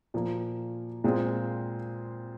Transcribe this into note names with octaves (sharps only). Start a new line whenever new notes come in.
A#2 F3 A#3
A#2 G#3 C4 F4